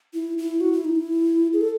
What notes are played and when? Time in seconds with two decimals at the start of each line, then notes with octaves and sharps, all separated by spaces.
0.14 E4
0.38 E4
0.60 F#4
0.73 E4
0.84 D#4
0.96 E4
1.53 G#4
1.61 A4